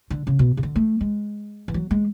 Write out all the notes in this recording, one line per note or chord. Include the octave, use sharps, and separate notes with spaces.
D3
C#3
B2
C#3
D3
A3
G#3
E3
F#3
G#3